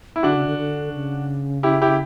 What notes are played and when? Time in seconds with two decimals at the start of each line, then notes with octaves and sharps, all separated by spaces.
0.16 E4
0.23 D3 D4 F#4
0.35 C#3
0.47 D3
0.58 D3
0.94 C#3
1.63 E4 G4
1.82 E4 G4